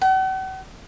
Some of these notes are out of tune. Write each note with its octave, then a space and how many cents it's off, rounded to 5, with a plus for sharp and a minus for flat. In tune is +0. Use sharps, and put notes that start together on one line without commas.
F#5 +45